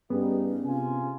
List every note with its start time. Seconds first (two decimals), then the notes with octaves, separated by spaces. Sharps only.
0.10 G2 B3 C#4 D#4 G4 G#4
0.65 C3 F4 G#5